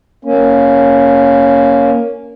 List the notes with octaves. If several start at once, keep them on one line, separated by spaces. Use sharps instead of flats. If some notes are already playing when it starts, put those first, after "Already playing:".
A#3 C#4